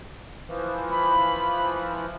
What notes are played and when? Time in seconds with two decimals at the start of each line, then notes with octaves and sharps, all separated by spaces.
0.47 E3 F3
0.91 B5